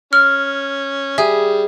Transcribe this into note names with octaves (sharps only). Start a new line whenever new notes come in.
C#4 F6
G3 G#4 E5